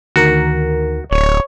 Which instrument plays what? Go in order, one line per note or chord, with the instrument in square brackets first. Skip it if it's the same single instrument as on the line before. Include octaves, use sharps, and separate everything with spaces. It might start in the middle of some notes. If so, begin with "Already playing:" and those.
[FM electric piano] D2 D#3 A#4 [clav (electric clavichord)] F#4
[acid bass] D1 [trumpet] C#5